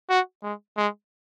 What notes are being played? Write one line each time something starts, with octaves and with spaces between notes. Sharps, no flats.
F#4
G#3
G#3